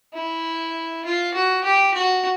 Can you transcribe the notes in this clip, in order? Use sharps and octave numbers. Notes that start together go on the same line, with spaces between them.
E4
F4
F#4
G4
F#4